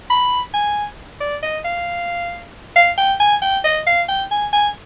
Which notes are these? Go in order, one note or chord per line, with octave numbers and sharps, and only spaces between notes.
B5
G#5
D5
D#5
F5
F5
G5
G#5
G5
D#5
F5
G5
G#5
G#5